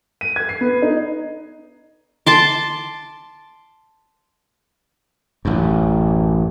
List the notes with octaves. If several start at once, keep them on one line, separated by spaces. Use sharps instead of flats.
D#7
G#6
C7
B3
D#4
A5 C6 D6
A1 F#2